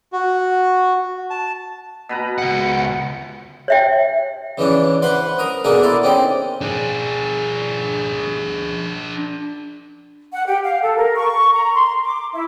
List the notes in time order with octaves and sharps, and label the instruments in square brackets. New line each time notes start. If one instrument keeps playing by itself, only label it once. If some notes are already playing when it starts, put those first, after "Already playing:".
[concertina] F#4
A5
[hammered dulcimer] B2 B4 A#5
[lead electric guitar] C#2 F#5
[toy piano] C#5 E5 G5
[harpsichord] C#3 E3 C#4 D4
B4 C5 F#5 B5 C6
A#4 A#5 D#6
B2 A3 A#3 D4 G#4 A#4
E4 D5 C6
C4 C#4 D#4 G5
[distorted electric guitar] D4 G#4
[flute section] F#5
G4
F5
A4
A#4
C#6
A#5
C6
D6
E4